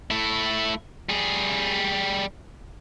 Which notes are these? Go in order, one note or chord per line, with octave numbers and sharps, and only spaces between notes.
A3 E4
G3 G#4